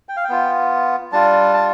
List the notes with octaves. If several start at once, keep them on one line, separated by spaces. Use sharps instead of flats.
G5
F5
G5
B3 F4
G3 D4 F4 A5
A5